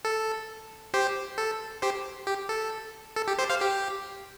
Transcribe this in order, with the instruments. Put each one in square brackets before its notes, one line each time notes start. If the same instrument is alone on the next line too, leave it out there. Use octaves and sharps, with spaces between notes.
[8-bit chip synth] A4
G4 C5
A4
G4 C5
G4
A4
A4
G4
G4 C5
C5 F5
G4